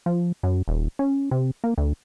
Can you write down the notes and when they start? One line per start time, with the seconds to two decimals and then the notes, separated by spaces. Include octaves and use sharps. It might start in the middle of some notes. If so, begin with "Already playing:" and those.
0.06 F3
0.43 F#2
0.68 D#1
0.99 C#4
1.31 C3
1.64 A#3
1.78 D2